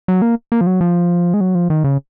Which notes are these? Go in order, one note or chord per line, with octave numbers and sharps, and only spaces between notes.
F#3
A#3
A#3
F3
F#3
F3
G#3
F#3
F3
D#3
C#3